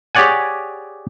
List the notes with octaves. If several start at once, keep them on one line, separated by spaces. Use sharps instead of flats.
G4 G#4 C#5 D5 F#5 G#5